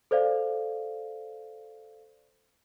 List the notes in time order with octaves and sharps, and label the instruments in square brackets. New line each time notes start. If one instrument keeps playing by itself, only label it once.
[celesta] A4 C5 D5 F5